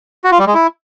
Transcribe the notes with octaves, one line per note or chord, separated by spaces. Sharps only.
F#4
F4
G3
G#3
E4